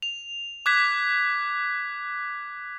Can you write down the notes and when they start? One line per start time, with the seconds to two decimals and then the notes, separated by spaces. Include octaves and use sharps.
0.02 F7
0.66 D6 F#6 G#6 B6